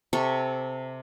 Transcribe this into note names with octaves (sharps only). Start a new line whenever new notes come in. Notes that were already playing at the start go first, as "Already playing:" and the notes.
C3 A4 C#6